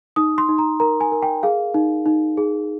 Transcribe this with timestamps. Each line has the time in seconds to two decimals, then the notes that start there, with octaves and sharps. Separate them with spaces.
0.16 D#4 D#6
0.38 C6
0.49 D#4
0.58 A#5
0.80 A#4 A#5
1.01 G#5
1.12 A#4
1.22 G5
1.43 G#4 F5
1.74 D#4
2.06 D#4
2.37 G#4